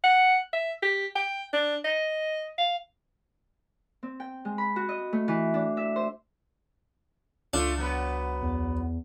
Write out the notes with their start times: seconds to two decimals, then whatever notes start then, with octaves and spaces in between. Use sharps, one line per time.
0.04 F#5
0.53 E5
0.82 G4
1.16 G5
1.53 D4
1.85 D#5
2.58 F5
4.03 C4
4.20 G5
4.45 G#3
4.58 B5
4.76 F#4
4.89 D#5
5.13 A3
5.28 E3
5.54 D4
5.77 E5
5.96 C5
7.54 C#2 A3 D4 F4
7.78 F#3 B3 B4
8.42 E2